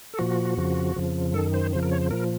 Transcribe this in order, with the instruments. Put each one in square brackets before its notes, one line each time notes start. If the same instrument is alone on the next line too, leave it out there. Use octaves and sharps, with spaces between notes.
[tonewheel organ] A4
A#2 F3 F#4
F2 C#3 F3
F2 C#3 F3
F#2 D#3 A4
C5
F2 C#3 F3 C5
A#4
C#5
C5
A#2 F3 A#4